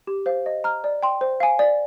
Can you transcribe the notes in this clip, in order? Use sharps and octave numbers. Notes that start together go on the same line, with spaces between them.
G4
C5 F5
D#5
A#5 F6
D5
G5 C6
C5
F5 G#5
D5